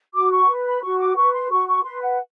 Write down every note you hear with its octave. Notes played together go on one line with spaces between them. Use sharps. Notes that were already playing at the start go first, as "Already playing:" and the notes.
F#4 D6
C#6
B4
B5
F#4 C#6
D6
B4 C#6
C6
F#4 C#6
C#6
B4 C6
F#5